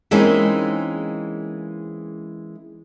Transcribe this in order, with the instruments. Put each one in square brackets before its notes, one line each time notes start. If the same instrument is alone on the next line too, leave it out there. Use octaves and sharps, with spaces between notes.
[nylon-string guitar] E3 G#3 A#3 C4 C#4 D#4